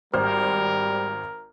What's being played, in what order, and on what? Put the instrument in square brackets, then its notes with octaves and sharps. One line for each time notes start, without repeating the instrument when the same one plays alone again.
[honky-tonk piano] G#1 C5 F6 [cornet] G3 [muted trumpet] A#4